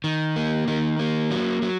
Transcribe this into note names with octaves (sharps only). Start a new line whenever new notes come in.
D#3
A#3
D#3
A#3
F#3
F#3